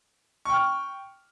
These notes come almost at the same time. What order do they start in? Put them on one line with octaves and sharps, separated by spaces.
C#6 G5 F6